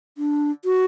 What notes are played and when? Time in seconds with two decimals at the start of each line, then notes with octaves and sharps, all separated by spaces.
0.18 D4
0.65 F#4